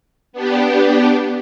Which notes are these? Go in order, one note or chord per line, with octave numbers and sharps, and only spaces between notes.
B3 D4 G4